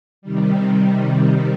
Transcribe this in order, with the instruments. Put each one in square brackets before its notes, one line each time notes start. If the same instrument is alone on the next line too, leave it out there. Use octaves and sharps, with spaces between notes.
[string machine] C3 D#3 G3